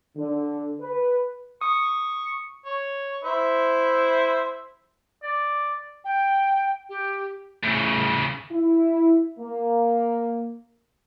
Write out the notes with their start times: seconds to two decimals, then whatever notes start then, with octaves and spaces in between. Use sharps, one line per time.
0.17 D3
0.81 B4
1.61 C#6 D#6
2.66 C#5
3.24 E4 C5 E5
5.23 D5
6.05 G5
6.89 G4
7.63 A2 C#3
8.51 E4
9.40 A#3